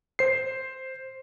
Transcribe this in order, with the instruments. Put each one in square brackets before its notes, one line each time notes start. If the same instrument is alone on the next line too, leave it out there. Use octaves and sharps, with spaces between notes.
[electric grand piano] C5 C7